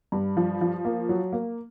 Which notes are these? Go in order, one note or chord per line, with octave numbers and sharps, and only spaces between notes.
G2
F3
F3
A#3
F#3
A#3